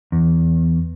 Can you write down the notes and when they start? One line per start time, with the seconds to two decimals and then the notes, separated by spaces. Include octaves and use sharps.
0.12 E2